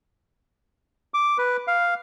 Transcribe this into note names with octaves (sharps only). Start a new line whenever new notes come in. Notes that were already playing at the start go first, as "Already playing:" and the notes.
D6
B4
F5